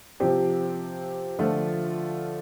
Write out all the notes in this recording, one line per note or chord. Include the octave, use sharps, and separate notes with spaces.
C3 F3 C4 G4
D3 F3 A3 F4